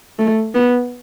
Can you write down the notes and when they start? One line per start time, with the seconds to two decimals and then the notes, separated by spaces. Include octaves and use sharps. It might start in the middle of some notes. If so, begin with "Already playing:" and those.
0.19 A3
0.54 B3